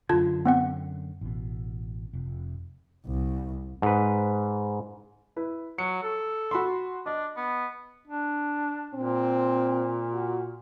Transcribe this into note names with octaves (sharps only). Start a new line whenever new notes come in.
F#2 D3 F4 A5 G#6
B3 C4 F#5
A1 B2
F1
C2
G#2 B4
E4 B4
F#3 C#7
A4
F#4 B5 C6
D4 D#5
B3
D4
A#2 C4
F#4